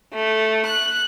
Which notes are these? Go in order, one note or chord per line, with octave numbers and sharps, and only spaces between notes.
A3
F#6